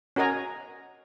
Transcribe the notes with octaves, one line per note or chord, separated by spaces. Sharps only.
C#4 F#4 A#4 D#5 G#5 A#5